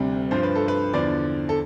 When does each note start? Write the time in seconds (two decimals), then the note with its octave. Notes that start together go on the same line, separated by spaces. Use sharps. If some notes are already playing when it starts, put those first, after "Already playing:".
Already playing: D2 C3 G3
0.31 G2 F3 C5
0.43 B4
0.55 A4
0.68 B4
0.93 E2 D3 F3 D5
1.49 A4